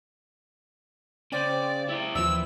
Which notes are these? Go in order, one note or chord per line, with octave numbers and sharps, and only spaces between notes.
C#3 C5 D5 G5
E4 D5
D#2 E3 F3 E6